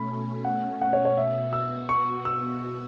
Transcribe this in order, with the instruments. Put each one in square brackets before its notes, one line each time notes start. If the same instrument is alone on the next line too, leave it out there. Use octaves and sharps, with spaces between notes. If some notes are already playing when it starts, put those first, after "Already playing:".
Already playing: [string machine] B2 A3 C#4 [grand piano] B5
[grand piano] F#5
F#5
C#5
C#5
[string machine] B2 B3 F#4 [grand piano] E5
[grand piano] E6
C#6
E6